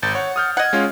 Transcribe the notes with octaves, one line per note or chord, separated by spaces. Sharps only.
G#1 G6 A6
C#5 F#5
D#6 F6 G6
D#5 F#5 G#6
G#3 C#4 F4